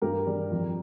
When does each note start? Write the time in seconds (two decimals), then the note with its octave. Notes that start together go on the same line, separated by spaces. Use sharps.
0.02 G2 G4 A#4
0.27 G3
0.51 F2